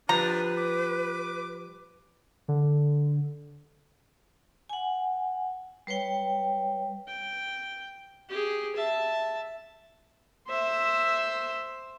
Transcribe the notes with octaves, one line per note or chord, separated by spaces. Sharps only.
F3 G3 D4 B4 A#5
D6
D3
F#5 G#5
G3 B4 C#5 G5
G5
G4 G#4
E5 A5
C5 E5